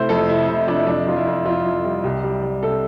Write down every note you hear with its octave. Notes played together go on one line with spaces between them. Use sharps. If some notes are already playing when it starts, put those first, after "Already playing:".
Already playing: C3 A3 E4 C5
F2 A4
C3 E4
C3 E4
F2 D4
E4
F2 D4
F2 F4
E4
F2
F2 F4
F2
G3
C2 G4
G3
G3
C3 A4